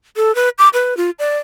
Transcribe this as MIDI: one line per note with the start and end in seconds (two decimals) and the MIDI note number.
0.16 0.34 69
0.35 0.49 71
0.58 0.69 86
0.74 0.97 71
0.97 1.10 65
1.19 1.38 74